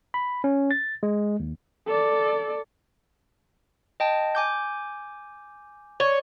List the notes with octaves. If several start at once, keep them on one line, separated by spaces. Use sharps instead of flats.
B5
C#4
A6
G#3
D#2
A4 D5
D#5 G5 A5
G#5 D6 G6
C#5 D5